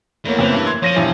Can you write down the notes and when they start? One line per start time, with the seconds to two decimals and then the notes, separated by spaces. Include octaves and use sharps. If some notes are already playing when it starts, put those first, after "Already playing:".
0.25 E2 A3 A#3 C#5
0.39 F#1 E3 B3 C4
0.53 G2
0.67 C6 G#6
0.82 F3 C#5 A#6 D#7
0.96 E1 G2 E3